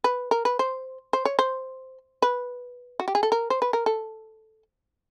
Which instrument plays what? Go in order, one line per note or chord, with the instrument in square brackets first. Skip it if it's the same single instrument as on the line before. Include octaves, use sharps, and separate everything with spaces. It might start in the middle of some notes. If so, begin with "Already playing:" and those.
[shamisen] B4
A#4
B4
C5
C5
C#5
C5
B4
F#4
G4
G#4
A4
A#4
C5
B4
A#4
A4